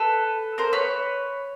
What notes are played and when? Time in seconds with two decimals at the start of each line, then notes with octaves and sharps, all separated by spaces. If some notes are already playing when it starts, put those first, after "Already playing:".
Already playing: A4 B4
0.58 A#4 C5
0.73 B4 C#5